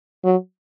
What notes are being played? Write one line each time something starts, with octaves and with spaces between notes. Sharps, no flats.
F#3